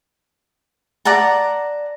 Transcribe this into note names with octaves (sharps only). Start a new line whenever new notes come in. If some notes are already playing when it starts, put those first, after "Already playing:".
D5 F#5 A5 A#5